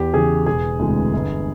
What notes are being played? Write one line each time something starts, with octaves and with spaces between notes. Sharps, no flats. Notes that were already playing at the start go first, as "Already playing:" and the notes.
Already playing: E2 G4
C#3 E3 G#4
E1 G#4
D2 C3 E3 G#3
G1